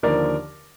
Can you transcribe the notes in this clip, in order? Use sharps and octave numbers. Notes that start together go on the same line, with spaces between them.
D#2 D3 F3 A#4 D5